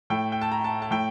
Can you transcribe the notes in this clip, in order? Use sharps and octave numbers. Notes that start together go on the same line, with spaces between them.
A2 G5
G5
A5
A#5
A5
A5
A2 G5